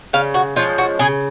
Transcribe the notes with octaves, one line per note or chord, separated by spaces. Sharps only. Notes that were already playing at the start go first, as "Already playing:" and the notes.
C#3 F5
F#4
F3 G#3 C#4 F4
F#4
C#3 G#4